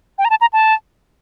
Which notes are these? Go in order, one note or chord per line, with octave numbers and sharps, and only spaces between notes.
G5
A#5
A5
A#5
A5